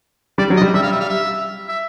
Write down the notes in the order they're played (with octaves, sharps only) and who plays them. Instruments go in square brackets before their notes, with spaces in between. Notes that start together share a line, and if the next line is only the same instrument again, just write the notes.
[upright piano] G3 [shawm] D5
[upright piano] F#3
[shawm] D#5
[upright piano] G3
[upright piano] G3 [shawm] E5
[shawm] F5
E5
F5
E5
E5